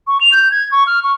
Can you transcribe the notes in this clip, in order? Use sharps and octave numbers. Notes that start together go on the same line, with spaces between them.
C#6
F7
G6
G#6
C#6
F6
C#6